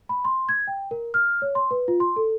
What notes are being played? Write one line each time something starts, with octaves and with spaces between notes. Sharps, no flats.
B5
C6
G#6
G5
A#4
F6
C#5
C6
B4
F4
C6
A4